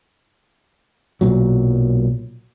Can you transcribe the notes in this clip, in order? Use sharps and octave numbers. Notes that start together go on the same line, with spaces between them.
B1 A#2 F#3